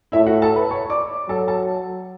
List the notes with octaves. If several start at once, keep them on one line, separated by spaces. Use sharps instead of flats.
A2 E4 E5
F#4 F#5
A4 A5
B4 B5
C#5 C#6
D5 D6
F#3 A4 A5
A4 A5